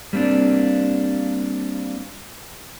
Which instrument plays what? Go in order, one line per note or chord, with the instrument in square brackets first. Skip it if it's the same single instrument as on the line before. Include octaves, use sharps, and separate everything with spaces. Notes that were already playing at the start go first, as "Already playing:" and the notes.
[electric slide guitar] G3 A#3 C4 D4